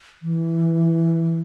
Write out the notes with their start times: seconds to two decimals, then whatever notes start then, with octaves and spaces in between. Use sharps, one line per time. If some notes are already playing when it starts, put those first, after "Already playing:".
0.23 E3